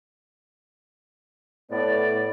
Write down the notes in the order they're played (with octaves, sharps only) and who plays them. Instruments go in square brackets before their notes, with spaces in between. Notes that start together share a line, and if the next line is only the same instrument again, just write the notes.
[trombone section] A2 B3 [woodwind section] D5